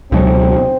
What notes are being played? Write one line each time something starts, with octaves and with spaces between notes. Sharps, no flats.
C#2 B2 F#3 C4